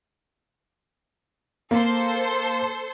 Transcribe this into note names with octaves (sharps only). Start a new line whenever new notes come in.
A#3 A4 C5 C6